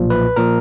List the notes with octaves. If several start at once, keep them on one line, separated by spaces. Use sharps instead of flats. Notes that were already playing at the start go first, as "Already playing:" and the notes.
Already playing: B1 A#2 F3
B4
A#2 F3 A#4